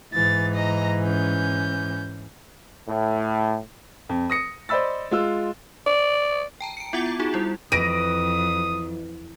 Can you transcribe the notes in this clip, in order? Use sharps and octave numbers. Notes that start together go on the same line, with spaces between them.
G#2 E3 A6
D#5 A#5
C#4 G6
A2
F2
D#6 A#6 C#7
C5 D5 D#5 B5 E6 A6
G#3 F4 E6
D5
G5 A5 A#5
C#7 D7
B3 E4 F4 F#5 D6 A6
A#5
D#4 F4 F#4 G#4
G3 E4 F4
F2 E3 D#6 A#6 D7 D#7